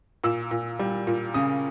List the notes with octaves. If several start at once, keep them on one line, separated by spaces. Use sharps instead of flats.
A#2 E6
A#2
G3
A#2
C#3 D#6